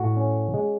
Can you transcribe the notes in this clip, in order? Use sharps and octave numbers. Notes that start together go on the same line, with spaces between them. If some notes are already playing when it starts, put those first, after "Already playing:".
Already playing: A2 F#4
C#4
G#3